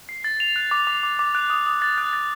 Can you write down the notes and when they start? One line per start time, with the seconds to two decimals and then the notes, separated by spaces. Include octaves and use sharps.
0.09 C7
0.24 A6
0.40 F7
0.56 F#6
0.71 D6
0.87 D6
1.03 D6
1.19 D6
1.35 F#6
1.50 D#6
1.66 D#6
1.82 A6
1.98 F#6
2.13 A6